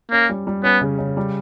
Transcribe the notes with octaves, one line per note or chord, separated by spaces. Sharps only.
A#3 C#4
G3
G3
B3 C#4
C#3
C#3
G3